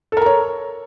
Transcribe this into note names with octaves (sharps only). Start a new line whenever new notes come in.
A4 A#4 C#5 A#5